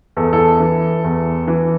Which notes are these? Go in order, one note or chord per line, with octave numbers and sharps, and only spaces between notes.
E2 A4
E4 A4
E3
E2
E3